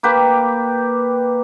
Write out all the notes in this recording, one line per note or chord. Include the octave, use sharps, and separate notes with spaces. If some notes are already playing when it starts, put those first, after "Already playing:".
A#3 G4 B4